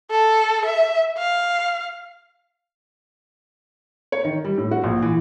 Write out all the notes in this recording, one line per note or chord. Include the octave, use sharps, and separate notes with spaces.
A4
E5
F5
C#5
D#3
G3
A2
F#4
A#1
E3